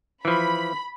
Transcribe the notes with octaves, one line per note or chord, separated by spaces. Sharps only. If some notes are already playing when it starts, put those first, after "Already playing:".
E3 F3 B5